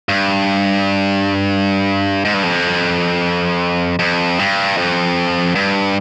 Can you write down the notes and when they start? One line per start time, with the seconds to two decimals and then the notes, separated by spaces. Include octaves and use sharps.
0.09 G2
2.25 G#2
2.34 G2
2.43 F2
3.99 F2
4.39 G2
4.77 F2
5.55 G2